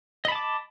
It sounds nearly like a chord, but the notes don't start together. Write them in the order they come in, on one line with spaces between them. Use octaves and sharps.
D#5 B5 A5 D6